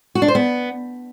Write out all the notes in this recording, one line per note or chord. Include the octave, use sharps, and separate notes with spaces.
F#4
D4
C5
B3